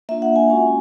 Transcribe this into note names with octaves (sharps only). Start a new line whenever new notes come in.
A#3 D4 F4 E5
F#5
G#5
G#3 C#4 F#4 G#5